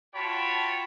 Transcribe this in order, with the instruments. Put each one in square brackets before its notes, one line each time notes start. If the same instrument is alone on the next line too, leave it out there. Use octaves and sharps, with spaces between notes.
[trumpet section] F4 F#4 C#5 G5 A5 B5